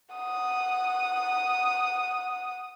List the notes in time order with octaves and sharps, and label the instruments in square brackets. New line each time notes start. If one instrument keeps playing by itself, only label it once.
[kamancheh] F#5 D#6